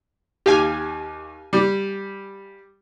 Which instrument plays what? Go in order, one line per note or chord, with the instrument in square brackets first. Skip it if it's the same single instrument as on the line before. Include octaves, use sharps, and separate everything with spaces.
[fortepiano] D#2 [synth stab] G4 F5 G#5
[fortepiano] G3